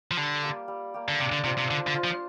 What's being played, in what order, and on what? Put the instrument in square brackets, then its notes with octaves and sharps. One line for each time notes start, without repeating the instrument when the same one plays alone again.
[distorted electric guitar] F3
[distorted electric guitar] D3 [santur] G3
[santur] A#3 G4
G3
A#3 G4
[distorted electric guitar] D3
[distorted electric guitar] C3 [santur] D4
[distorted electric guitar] D3
[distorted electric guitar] C3 [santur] F4 C5
[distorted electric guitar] C3
[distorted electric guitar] D3 [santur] D4
[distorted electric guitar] D3
[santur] F4 C5
[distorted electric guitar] F3